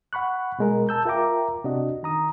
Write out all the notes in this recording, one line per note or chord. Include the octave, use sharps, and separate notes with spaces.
F#5 B5 C#6 F#6
B2 G#3 A#4
A5 E6 G6
F4 A#4 E5 G5 A#5 D6
C3 D4 F#4 D#5
D#3 A#5 D#6